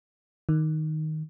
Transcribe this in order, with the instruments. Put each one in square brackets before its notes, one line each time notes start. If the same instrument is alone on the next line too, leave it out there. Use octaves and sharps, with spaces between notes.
[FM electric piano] D#3